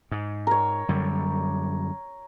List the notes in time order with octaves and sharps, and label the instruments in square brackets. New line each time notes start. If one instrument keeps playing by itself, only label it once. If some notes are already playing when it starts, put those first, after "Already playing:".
[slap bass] G#2
[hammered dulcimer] A#4 C#5
[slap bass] F#2 D3 G3